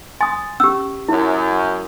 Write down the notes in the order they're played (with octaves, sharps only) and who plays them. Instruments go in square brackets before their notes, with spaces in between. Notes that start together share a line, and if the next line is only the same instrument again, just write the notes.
[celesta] G#5 A6 [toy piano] C6 D#6
[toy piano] C#4 G4 [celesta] E6
[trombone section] F#2 [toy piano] E4